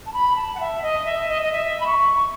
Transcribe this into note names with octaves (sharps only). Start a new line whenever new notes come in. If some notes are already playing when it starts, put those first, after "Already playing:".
A5
B5
A5
F#5
E5
D#5
E5
D#5
D#5
E5
B5
C#6